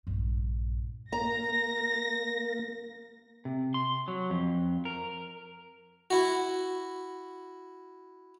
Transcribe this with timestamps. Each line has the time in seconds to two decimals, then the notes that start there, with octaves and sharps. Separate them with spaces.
0.07 A#1 G2
1.12 A#3 A#5 A#6
3.45 C3
3.74 C6
4.08 F#3
4.30 F2
4.85 A#4
6.10 E4 F#4